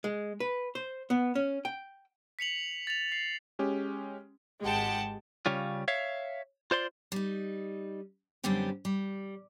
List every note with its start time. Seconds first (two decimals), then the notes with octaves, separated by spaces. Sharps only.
0.04 G#3
0.40 B4
0.75 C5
1.10 B3
1.35 C#4
1.65 G5
2.39 B6 C#7 F7 F#7
2.87 A6 F7
3.12 C7
3.59 G#3 C#4 G4
4.62 G#1 G#3 G4 F#5 G5 A5
5.46 C#3 G3 C#4 F4
5.88 C#5 E5 F5
6.71 F4 C5 D5 C6
7.12 G3 D#4
8.44 F#2 D3 G3 B3 C4 G4
8.85 G3